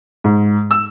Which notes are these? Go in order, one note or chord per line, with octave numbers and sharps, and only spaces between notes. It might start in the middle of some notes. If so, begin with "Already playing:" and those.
G#2
E6